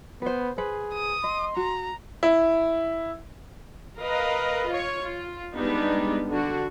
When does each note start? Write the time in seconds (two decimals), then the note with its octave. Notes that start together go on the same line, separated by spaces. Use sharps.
0.22 B3 B4 C5
0.58 G#4 B4 C5
0.94 D#6
1.24 D#5 C6
1.56 F#4 A#5
2.23 E4
4.00 A#4 B4 D#5 F5
4.69 F4 C#5
5.03 F4
5.53 G3 G#3 B3 D4 D#4
6.30 D3 F#4